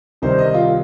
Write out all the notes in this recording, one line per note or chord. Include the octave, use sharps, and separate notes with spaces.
C2 C3 D#3 C5
D#5
F4